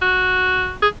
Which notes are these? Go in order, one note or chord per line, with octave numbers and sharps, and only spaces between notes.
F#4
G#4